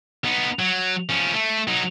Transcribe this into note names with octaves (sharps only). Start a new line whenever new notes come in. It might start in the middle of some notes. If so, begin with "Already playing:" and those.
B3 D#4
F#3
F3 C#4
A3
F#3 D#4